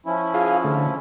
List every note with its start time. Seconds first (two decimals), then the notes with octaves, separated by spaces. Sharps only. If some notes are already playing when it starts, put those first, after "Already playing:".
0.06 F3 C#4 E4
0.34 F4 G#4 F5
0.64 D3 A3